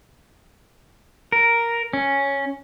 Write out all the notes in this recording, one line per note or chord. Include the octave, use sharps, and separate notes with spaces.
A#4
C#4